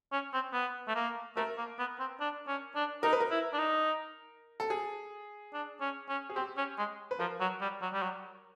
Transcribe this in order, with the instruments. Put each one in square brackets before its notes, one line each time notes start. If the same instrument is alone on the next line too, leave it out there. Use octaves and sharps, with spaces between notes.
[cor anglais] C#4
C4
B3
A3
A#3
[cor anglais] A3 [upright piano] A#4
[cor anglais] A#3
B3
C4
D4
C#4
D4
[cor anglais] D#4 [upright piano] A#4
[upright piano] B4
A#4
[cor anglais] E4
D4
D#4
[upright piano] A4
G#4
[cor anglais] D4
C#4
C#4
[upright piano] G#4
[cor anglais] C4 [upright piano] G4
[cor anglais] C#4
G#3
[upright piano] B4
[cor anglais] F3 [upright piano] A#4
[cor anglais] F#3
G3
F#3
G3
F#3